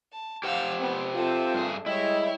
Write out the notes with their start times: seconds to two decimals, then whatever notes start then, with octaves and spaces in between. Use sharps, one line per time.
0.12 A5
0.43 G4 C5 F5 F#5 E6
0.80 B3 C4
1.15 C4 F4 A4 E5
1.54 G2 G#4
1.86 G3 G#3 E4 C#5 D#5 G5